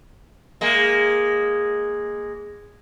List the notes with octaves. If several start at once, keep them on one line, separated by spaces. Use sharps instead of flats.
G#3 A#3